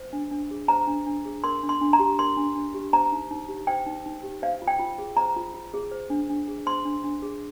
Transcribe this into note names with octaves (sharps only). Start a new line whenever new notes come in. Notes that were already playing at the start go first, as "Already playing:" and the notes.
Already playing: C5
D4
D4
G#4
C5 A#5
D4
D4
G#4
A#4 C6
D4
C6
D4
A#5
G4
A#4 C6
D4
D4
G4
C5 A#5
D#4
D#4
G4
C5 G5
D#4
D#4
G4
C5 F5
F4
G5
F4
G#4
C5 A#5
F4
F4
G#4
C5
D4
D4
G#4
C5 C6
D4
D4
G#4